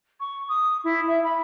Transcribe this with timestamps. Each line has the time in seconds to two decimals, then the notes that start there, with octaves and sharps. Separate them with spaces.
0.20 C#6
0.49 D#6
0.84 E4
1.07 E5
1.24 B5